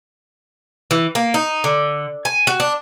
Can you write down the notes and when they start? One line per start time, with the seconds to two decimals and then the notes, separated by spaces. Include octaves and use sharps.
0.91 E3
1.15 A#3
1.34 D#4
1.64 D3
2.25 G#5
2.47 F#4
2.60 D4